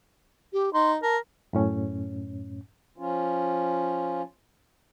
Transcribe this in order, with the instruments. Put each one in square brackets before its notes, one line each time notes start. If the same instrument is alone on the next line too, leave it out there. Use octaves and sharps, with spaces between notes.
[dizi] G4
[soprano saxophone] D#4 [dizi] C6
[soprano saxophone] A#4 [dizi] A5
[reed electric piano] F#2 A2 C#4
[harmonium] F3 C#4 F4